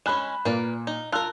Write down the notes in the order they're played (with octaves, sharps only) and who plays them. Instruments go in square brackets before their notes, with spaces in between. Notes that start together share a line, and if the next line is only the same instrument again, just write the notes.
[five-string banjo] G#3 C#4 [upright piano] B5 F#6 E7
[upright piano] A#2 [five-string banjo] A#3 B4 D5
[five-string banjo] D#4
[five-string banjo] F4 A#4 [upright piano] A5 E6 F#6